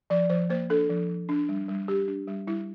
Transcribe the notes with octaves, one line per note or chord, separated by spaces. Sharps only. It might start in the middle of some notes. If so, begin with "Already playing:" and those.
F3 D5
F3 C5
A#3 C5
D4 A4
F3
F3
D4
G3
G3
D4 G4
D4
G3
G3 E4